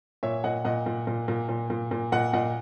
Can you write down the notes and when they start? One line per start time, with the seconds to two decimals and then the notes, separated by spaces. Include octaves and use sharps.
0.23 A#2 C#5 E5
0.44 A#2 D#5 F#5
0.65 A#2 D#5 F#5
0.86 A#2
1.07 A#2
1.28 A#2
1.49 A#2
1.70 A#2
1.91 A#2
2.12 A#2 D#5 F#5
2.33 A#2 D#5 F#5